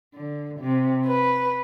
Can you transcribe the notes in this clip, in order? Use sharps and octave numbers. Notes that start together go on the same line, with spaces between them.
D3
C3
B4